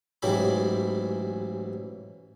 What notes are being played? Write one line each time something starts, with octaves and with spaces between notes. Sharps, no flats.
A1 G#2 E3 F#3 G4 B5